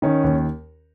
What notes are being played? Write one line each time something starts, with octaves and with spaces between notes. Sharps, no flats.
D#3 C#4
D#2